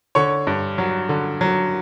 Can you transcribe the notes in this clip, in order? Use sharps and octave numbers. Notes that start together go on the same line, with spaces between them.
D3 C#5 C#6
G2
F#3
D3
F#3